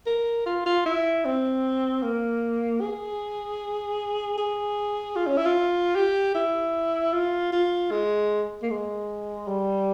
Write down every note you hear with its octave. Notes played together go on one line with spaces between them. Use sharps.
A#4
F4
F4
E4
C4
A#3
G#4
G#4
F4
C#4
E4
F4
G4
E4
F4
F4
G#3
A#3
G#3
G3